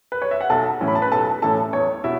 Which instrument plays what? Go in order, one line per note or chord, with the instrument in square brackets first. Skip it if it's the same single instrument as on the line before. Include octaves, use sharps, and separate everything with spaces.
[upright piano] B4
C#5
E5
F#5
B1 A4 A5
A2 E3 C#4 E4
B5
A5
B4 B5
B1 A4 A5
A2 E3 C#4 E4 A4 A5
E2 C#5
B2 E4 E5